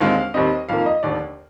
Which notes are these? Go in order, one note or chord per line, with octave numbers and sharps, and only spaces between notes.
D#2 D3 G#3 C4 F5
D#2 D#3 G3 C4 D#5
F2 D#3 A#3 F5
D#5
F1 D#2 D3 D5